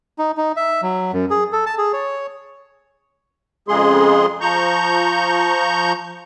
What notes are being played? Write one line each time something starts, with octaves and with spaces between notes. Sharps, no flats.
D#4
D#4
E5
F#3
F#2
G#4
A4
A5
G#4
C#5
F2 C#3 G#3 G#4 C6
F3 A#5 C#6 G6